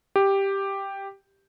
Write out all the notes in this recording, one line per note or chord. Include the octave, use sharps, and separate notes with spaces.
G4